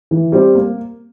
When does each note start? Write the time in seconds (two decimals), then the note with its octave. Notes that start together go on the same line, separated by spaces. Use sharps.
0.11 E3
0.32 G3 C4 G4
0.55 A#3